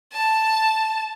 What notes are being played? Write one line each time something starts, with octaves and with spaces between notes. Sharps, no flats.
A5